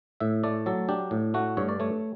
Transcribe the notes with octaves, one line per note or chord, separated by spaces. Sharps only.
A2 E5
A3 D5
F#3 A4
D4 G4
A2
A3 F#4
G2 C#5
D5
A3 C#5